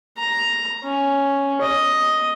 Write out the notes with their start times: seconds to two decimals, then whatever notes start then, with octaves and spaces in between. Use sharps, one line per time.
0.18 A#5
0.84 C#4
1.61 D#5